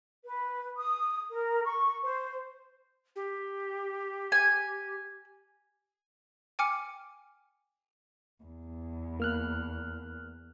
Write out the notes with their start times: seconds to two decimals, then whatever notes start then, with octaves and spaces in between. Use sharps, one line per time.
0.23 B4
0.78 D#6
1.30 A#4
1.64 C#6
2.03 C5
3.16 G4
4.32 G#5
6.59 G5 G#5 D6 F6 C#7
8.44 E2
9.20 A#3 F6 F#6